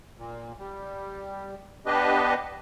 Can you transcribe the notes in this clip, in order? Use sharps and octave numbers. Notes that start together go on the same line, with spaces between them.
A#2
G3
B3 D4 G4 B4 D#5